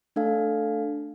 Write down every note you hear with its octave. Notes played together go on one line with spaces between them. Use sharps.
A3 D4 A4 F5